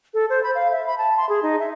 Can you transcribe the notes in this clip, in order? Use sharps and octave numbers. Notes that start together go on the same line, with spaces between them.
A4
C5
B5
F5
E5
B5
A5
C6
G#4
D#4
E5